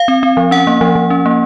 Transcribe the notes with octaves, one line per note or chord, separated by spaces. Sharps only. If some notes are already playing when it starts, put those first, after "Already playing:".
Already playing: F5
C4
C4
F3
C#4 F#5
A#3
F3
F3
C#4
A#3